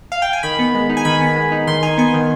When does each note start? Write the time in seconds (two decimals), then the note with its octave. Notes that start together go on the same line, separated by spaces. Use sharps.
0.12 F5
0.22 G5
0.33 G#5
0.43 D#3 B5
0.59 B3
0.75 G#3
0.89 D#4
0.97 G#5
1.05 D#3 B5
1.21 B3
1.36 G#3
1.52 D#4
1.67 D#3 C6
1.83 D#4 G#5
1.98 B3 G#5
2.14 D#3